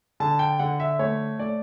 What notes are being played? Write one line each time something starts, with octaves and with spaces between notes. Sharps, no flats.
D3 A5
G5
D3 F#5
E5
A3 C#5
A3 D5